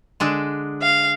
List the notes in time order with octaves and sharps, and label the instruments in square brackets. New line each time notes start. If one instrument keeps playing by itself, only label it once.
[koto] D3 G#3 D4
[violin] F5